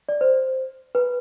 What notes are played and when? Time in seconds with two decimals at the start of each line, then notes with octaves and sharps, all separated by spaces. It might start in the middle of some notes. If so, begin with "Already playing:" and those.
0.09 D5
0.21 C5
0.95 B4